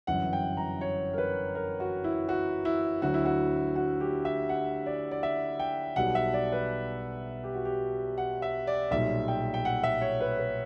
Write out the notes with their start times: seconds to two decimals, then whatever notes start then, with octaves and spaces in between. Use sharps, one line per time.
0.07 G1 F#2 E3 F#5
0.33 G5
0.57 A#5
0.81 C#5
1.13 A#4
1.18 B4
1.55 A#4
1.80 F#4
2.04 E4
2.29 F#4
2.65 E4
3.02 D2 D3 F#3 F#4
3.14 E4
3.25 F#4
3.76 F#4
4.00 G4
4.25 E5
4.49 F#5
4.86 D5
5.11 D5
5.23 E5
5.60 G5
5.96 B1 B2 G3 F#5
6.15 E5
6.34 D5
6.52 B4
7.44 G4
7.55 F#4
7.65 G4
8.18 F#5
8.42 E5
8.67 D5
8.91 B1 A#2 G3 E5
9.28 G5
9.54 G5
9.65 F#5
9.84 E5
10.01 C#5
10.20 B4
10.38 B4